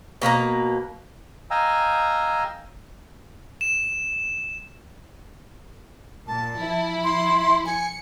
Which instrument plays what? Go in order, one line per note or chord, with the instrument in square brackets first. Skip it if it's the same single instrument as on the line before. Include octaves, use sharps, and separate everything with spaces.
[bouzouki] B2 A#3 B4 A#5
[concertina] D#5 F5 G5 G#5 A#5 E6
[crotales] E7
[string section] A#2 [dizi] A5
[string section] F3 E4
[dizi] C6
[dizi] G#5 [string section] C#7